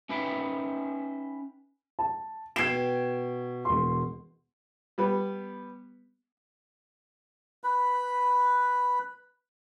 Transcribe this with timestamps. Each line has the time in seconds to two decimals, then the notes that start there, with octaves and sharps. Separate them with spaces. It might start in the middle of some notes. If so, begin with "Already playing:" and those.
0.09 C#4 D#4 B4 E5 G5
1.99 A5
2.56 B2 G5 G#6 C7 E7
3.65 E1 C6
4.98 G3 B3
7.64 B4 B5